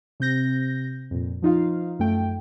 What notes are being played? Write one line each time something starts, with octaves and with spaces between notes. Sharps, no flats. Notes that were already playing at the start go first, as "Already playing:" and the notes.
C3 C4 G6 A#6
F2 A#2
F3 D#4 F4 F5
F#2 A3 G5